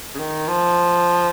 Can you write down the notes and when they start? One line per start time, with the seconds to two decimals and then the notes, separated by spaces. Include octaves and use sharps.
0.15 C#3
0.19 D#3
0.48 F3